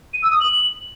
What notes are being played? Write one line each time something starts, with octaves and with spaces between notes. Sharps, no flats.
D#7
E6
D#6
F#7